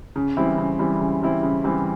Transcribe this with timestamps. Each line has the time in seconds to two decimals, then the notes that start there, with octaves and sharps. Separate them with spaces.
0.16 C#3
0.37 E3 G3 C4 E4
0.58 C#3
0.79 E3 G3 C4 E4
1.00 C#3
1.22 E3 G3 C4 E4
1.43 C#3
1.64 E3 G3 C4 E4